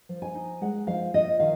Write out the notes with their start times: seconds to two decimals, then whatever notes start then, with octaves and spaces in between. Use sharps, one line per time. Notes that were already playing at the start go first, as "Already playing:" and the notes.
0.09 F3
0.22 G#5
0.35 D#4
0.61 G#3 F#5
0.87 F3 F5
1.14 F3 D#5
1.40 D#3 F5